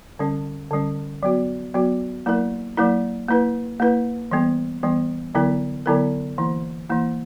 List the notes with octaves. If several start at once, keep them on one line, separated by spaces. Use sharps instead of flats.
D3 G3 C#4
D3 G3 C#4
F#3 B3 F#4
F#3 B3 F#4
F#3 A#3 E4 A#4
F#3 A#3 E4 A#4
A#3 E4 B4
A#3 E4 B4
E3 G3 B3
E3 G3 B3
D3 F#3 B3 E4 A#4
D3 F#3 B3 E4 A#4
E3 A#3 E4
E3 A#3 E4